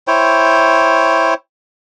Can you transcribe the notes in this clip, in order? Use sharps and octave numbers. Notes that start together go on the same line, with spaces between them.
E4 C5 C#5 G5